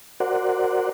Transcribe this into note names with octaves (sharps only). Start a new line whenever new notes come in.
F#4 A#4 C5 D5 F#5